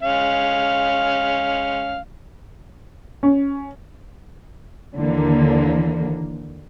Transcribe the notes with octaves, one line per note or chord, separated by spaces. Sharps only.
G#3 C#4 F5
C#4
D#2 D3 E3 A#3